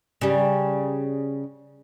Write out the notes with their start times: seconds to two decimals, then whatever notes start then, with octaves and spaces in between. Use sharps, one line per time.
0.21 C#3 G3